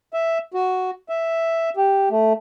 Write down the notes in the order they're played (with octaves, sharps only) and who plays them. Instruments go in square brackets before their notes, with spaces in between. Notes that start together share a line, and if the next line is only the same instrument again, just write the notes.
[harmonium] E5
F#4
E5
G4
A3